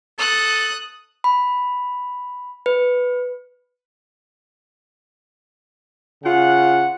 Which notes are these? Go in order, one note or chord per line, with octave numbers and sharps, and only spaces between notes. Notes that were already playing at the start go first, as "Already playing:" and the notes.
A4 D#6 F#6
B5
B4
C#3 F4 F#5